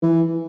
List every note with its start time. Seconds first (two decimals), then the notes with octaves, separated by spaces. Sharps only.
0.02 E3